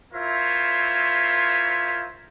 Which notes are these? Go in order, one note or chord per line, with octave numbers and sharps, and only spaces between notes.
E4 F4 A#4 C5 C#5 E5